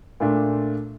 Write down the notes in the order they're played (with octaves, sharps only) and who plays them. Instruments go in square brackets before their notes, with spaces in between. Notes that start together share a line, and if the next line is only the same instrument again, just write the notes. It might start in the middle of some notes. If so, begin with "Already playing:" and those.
[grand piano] A#2 A3 D4 F4